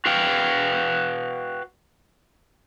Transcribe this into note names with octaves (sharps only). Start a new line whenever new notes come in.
F#4 B4 F5 G5